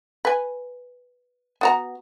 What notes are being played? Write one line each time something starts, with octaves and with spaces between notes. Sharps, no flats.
B4 G#5
B3 F#4 A#5